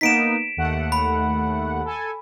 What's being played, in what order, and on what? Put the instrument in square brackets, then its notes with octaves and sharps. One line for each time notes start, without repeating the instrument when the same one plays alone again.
[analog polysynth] A#3 B3 D#4 [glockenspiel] B6 D7 E7
[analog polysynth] D#2 A3 F#5
[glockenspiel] B5
[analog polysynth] A4 G#5